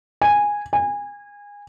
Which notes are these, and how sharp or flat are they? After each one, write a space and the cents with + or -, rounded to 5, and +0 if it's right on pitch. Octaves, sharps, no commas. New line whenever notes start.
G#5 -10
G#5 -25